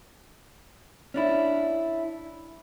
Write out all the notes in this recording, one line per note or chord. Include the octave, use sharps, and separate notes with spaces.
C#4 D4 E4